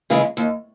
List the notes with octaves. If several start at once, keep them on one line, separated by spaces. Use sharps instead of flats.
C#3 E3 G#3
D#2